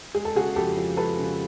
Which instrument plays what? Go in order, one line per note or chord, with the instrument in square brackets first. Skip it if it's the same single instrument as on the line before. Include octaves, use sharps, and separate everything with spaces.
[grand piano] G#3 [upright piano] G#4
[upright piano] A4
[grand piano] C#3 [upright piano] F#4 G#4
[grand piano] F2 [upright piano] G4 A4
[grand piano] F3
[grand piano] G#3 [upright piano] A4 B4
[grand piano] C#3